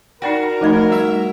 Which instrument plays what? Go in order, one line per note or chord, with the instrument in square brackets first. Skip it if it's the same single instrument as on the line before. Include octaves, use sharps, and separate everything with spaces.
[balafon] D#4 D5 G5 [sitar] F#4 [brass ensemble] A#4
[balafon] F3 A3 B5 [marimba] D#4 D#5 G#6
[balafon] G3 [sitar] E5